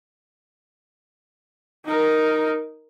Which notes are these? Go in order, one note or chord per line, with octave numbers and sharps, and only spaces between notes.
D#4 A#4